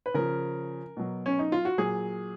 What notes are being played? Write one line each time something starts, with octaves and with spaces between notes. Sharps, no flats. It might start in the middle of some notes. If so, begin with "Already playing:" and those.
B4
C#3 F3 A#4
B2 F#3
C#4
D#4
F4
F#4
A#2 F#3 G#4